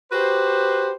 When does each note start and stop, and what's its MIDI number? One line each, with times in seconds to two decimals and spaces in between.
0.11 0.93 66
0.11 0.93 67
0.11 0.93 71
0.11 0.93 72